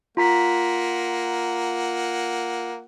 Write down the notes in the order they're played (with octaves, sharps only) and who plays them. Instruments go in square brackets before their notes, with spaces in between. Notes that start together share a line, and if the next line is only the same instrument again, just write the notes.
[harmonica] A#3 F#5 [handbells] F4 A#5 B6